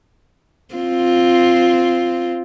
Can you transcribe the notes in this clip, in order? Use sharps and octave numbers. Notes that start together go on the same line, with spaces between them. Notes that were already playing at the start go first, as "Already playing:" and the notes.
C4 F4